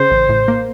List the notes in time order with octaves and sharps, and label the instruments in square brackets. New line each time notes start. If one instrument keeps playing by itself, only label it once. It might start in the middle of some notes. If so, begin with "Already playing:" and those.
Already playing: [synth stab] C#3 [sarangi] C5
[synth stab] A1
A2
A#3